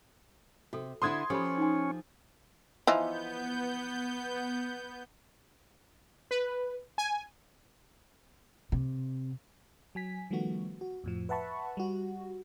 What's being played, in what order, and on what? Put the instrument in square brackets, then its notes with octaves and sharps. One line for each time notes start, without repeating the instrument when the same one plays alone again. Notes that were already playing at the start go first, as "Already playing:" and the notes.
[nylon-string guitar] C3 [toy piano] F#4 A4
[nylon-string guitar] D3 D4 E4 [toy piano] C5 [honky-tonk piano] C6 D#6 G#6
[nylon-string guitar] F3 G4 [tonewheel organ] C#4 [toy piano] A4 C#5 B5
[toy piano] D#4 G#5
[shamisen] E3 F3 D#4 [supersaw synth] B3 G6
[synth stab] B4
G#5
[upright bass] C3
[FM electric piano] F#3 G#5 B6
D#3 F3 G3 A3 B3 F#4
F#4
F2 A2 F3
B4 E5 F#5 A5 B5 C#6
G3 F#4